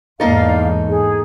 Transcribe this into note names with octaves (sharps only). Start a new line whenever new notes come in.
E2 G#2 A#3 D#4 A4 D5 F5
G#4